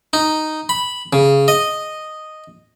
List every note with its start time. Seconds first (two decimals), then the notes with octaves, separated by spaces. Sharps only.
0.13 D#4
0.69 B5
1.13 C#3
1.48 D#5